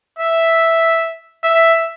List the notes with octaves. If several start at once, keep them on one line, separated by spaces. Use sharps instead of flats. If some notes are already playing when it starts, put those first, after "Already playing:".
E5
E5